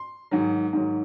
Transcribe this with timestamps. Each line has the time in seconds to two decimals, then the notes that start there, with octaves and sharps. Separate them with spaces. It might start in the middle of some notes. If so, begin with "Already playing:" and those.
Already playing: C6
0.31 G#2 D#3 F#3
0.73 G#2 D#3 F#3